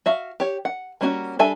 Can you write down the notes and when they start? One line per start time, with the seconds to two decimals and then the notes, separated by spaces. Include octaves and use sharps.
0.06 F#4 E5 F5
0.40 G4 C#5
0.65 F#5
1.01 G3 A#3 C#4 F4 F#4
1.39 G3 D4 A4 E5 G#5